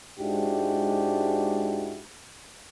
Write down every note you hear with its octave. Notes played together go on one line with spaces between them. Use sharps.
G#2 G#3 D4 E4 F#4 G4